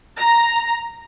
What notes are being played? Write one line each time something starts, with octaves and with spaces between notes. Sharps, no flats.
A#5